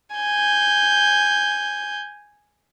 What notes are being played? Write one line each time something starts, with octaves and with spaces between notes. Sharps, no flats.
G#5 G6